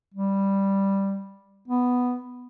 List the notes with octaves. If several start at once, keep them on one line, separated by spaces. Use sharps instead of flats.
G3
B3